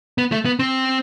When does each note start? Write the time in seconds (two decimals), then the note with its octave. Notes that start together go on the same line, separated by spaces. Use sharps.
0.18 B3
0.32 A3
0.45 B3
0.59 C4